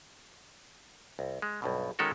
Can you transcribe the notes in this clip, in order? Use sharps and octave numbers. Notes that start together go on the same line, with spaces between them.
C2
G#3
B1 G2 B2
D#3 G#3 C#4 F#4 A4 A#4